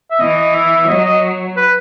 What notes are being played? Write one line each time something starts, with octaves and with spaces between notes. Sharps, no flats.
E5
E3 D#5
D#5
E5
F#3 D#5
D#5
B4